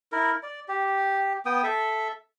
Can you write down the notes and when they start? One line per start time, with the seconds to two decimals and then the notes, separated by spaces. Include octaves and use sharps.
0.12 E4 A#4
0.43 D5
0.68 G4
1.46 B3 G5 D#6
1.64 A4 E5